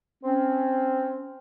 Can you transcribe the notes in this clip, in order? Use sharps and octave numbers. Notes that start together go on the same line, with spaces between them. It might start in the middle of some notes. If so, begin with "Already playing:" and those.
C4 C#4